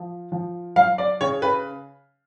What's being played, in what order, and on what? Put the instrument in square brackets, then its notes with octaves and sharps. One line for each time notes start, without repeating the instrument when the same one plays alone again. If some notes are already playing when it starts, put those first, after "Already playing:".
Already playing: [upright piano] F3
F3
F#3 F5
D5
C#3 C#5
B4